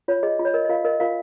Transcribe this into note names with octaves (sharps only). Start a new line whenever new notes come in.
F4 C#5
G#4 D#5
F4
C#5
A#4 D#5
D#5
F4 A#4 F5
A#4 D#5
F4 A#4 F5